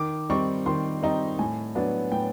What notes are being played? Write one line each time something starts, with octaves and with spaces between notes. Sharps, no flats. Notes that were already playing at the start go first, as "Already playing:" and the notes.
Already playing: D#3 D6
G3 C4 D#4 C#6
D#3 C6
G3 C4 D#4
A2 G#5
F#3 B3 D4
A2 G5